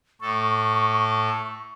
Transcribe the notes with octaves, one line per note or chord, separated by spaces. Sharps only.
A2 A4 C#6